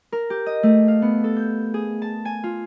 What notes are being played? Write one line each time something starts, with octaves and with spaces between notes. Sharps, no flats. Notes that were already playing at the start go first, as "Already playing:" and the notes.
A#4
G4
D#5
A3
F5
B3
A4
G6
G#4
A5
G#5
F4